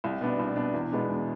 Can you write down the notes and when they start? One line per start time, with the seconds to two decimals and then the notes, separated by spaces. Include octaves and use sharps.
0.04 C2
0.21 B2 B3 D4
0.39 C2
0.56 B2 B3 D4
0.74 E2
0.91 B2 G#3 B3 D4
1.09 E2